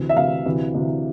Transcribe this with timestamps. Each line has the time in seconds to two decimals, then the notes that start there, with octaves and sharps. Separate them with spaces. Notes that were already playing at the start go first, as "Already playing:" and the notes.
Already playing: D2 C3 E3
0.09 E5
0.17 D2 C3 E3 F5
0.46 D2 C3 E3
0.74 D2 C3 E3